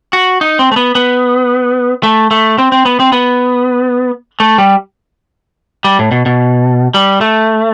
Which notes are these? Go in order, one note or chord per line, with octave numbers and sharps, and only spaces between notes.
F#4
D#4
C4
A3
B3
B3
A3
A3
C4
C4
B3
C4
B3
A3
G3
G3
A2
B2
B2
G3
A3